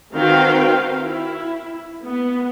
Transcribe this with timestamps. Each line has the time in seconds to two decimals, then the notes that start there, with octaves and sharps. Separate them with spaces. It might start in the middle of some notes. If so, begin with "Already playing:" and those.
0.13 D#3 C4 F#4 B4 F5 G5
0.95 E4
2.03 B3